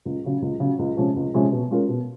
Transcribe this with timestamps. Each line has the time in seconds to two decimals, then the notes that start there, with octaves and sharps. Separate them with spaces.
0.05 C#2
0.24 C#3 F#3
0.42 C#2
0.60 C#3 F#3
0.79 C#2
0.97 C3 F3 G#3 C#4
1.16 C#2
1.34 C3 F3 G#3 C#4
1.52 B2
1.71 G#3 C#4 F4 A#4
1.89 B2